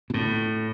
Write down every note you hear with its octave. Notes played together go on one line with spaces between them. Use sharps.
B2
A2